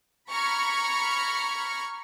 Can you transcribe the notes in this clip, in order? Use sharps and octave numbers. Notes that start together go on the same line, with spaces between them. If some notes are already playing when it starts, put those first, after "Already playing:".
A#5 B5 C#6 F6 G#6